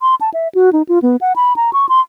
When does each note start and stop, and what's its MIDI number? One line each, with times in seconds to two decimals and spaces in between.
0.01 0.15 84
0.21 0.30 81
0.34 0.48 76
0.55 0.73 66
0.73 0.82 63
0.89 1.01 65
1.02 1.16 59
1.21 1.33 78
1.36 1.56 83
1.56 1.73 82
1.73 1.88 85
1.89 2.00 84